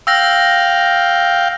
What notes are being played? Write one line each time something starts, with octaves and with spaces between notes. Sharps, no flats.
F5 G5 E6 A#6